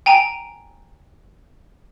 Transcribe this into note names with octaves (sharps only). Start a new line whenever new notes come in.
G5 G#5 A#5 D7